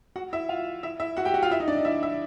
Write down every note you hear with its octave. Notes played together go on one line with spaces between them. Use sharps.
F#4 F#5
E4 E5
F4 F5
E4 E5
E4 E5
F#4 F#5
G4 G5
F#4 F#5
F4 F5
E4 E5
D#4 D#5
D4 D5
D#4 D#5
E4 E5
E4 E5